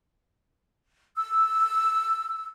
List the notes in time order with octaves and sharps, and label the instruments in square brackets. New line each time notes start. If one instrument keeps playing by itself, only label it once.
[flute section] E6